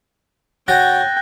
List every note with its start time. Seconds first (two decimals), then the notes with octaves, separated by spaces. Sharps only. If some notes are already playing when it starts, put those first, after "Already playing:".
0.68 C#3 F#4 G5 F#6 A6 A#6